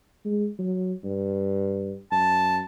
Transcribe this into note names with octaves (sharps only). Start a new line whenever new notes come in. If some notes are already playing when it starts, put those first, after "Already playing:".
G#3
F#3
G2
F#2 A5